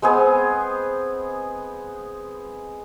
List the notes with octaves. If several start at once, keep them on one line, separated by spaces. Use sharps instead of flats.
G#3 B3 C4 G#4